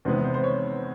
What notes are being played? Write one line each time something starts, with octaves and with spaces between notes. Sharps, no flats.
E2 C3 D#3 G#3 B3 C5
C5
C5
C#5